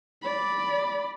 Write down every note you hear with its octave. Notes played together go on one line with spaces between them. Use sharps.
D5 B5